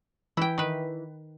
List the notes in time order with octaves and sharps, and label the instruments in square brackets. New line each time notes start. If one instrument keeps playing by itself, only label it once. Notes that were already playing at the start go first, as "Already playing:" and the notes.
[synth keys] E3 [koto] E4 G5
[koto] D#3 B4